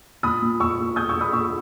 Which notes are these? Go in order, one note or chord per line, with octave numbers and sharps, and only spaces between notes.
A#2 B5 D#6
A#2
A#2 C#6 E6
A#2
A#2 D#6 G6
C#6 E6
A#2
B5 D#6
A#2 C#6 E6